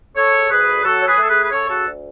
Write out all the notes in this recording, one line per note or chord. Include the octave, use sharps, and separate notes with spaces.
C#3 A4 C#5
D2 G#4 B4
F#3 F#4 A4
C#5
G#4 B4
A3 A4
G#4 B4
B4
C#3 A4 C#5
F#4 A4
D2